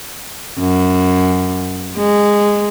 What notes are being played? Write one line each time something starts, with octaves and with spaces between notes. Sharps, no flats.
F#2
G#3